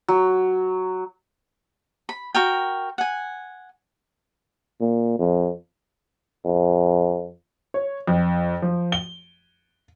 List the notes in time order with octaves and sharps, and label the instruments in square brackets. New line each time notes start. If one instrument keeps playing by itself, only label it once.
[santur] F#3
[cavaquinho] B5
F#4 A#4 G5
F#5 G#5
[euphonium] A#2
F2
F2
[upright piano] C#5
F2
F3
G7